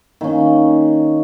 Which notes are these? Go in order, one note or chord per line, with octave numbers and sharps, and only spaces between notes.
D#3 A#3 C#4